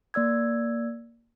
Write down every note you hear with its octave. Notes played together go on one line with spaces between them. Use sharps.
A#3 D5 E6 G#6